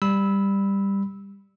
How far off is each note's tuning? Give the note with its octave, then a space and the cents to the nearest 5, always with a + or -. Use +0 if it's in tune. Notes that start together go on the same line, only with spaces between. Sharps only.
G3 +10 B5 +0 E6 -15